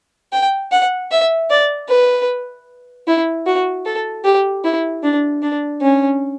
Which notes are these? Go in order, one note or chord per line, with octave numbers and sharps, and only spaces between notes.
G5
F#5
E5
D5
B4
E4
F#4
A4
G4
E4
D4
D4
C#4